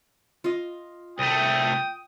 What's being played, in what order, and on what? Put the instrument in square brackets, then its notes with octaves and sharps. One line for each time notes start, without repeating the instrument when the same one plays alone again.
[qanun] F4 D#5
[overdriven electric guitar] C2 A3 [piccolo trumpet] G5 [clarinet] D#6